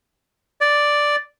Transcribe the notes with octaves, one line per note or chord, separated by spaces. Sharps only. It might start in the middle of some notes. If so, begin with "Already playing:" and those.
D5